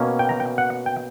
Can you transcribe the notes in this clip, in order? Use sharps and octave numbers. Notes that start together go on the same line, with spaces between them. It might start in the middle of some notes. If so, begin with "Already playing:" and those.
Already playing: B2 A#3 C#4
G5
A#5
G5
F#5
G5